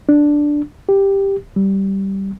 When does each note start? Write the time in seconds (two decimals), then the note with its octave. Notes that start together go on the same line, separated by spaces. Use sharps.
0.09 D4
0.89 G4
1.56 G3